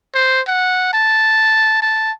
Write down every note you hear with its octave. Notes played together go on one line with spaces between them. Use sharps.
C5
F#5
A5
A5